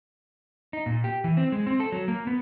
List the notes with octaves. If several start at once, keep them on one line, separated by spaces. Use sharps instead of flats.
D#4
A#2
G4
E3
C4
G#3
C4
A4
F#3
A#3
B3